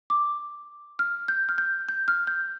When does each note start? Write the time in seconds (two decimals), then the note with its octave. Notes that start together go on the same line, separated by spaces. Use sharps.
0.10 D6
0.99 F6
1.28 G6
1.49 F6
1.58 G6
1.89 G6
2.08 F6
2.27 G6